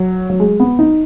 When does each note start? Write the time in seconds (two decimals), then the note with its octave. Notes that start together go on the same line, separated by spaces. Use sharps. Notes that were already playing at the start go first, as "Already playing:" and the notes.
Already playing: F#3
0.30 F#3
0.40 G#3
0.60 B3
0.79 D#4